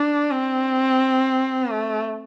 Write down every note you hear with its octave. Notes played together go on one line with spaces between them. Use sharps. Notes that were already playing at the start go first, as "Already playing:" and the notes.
Already playing: D4
C4
A3